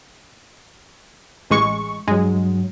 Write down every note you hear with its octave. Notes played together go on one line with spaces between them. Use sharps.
A1 G#3 C#6
G2 F#3 G#3